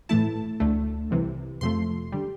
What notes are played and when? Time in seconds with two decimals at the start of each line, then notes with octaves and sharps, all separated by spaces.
0.09 A2 E3 A3 E4 A5
0.60 D2 D3 A3
1.11 C2 C3 E3
1.61 F2 C3 F3 A3 C6
2.12 D3 G3